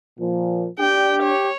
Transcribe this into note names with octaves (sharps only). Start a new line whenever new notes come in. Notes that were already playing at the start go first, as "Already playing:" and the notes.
A#2 F3
D4 G4 G5
C#5